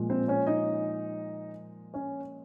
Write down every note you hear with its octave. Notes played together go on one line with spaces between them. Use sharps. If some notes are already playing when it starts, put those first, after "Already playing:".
Already playing: A#2 F3 G#3
C4 C5
C#4 C#5
D#4 D#5
C#4 C#5